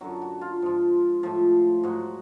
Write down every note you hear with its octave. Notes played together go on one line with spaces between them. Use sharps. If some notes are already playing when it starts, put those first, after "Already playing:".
F#2 D3 F#3 F#4
F#4
F4
G#2 F3
A2 F3
G#2 F#3 F#4